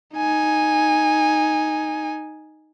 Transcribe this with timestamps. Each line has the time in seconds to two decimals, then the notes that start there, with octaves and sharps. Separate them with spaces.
0.15 D#4 G#5